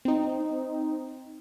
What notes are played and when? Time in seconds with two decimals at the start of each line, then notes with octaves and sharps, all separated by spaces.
0.05 C4 D#4